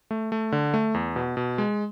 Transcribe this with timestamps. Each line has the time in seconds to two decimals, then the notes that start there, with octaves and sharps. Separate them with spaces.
0.11 A3
0.32 A3
0.52 D3
0.74 A3
0.94 E2
1.16 B2
1.37 B2
1.58 G#3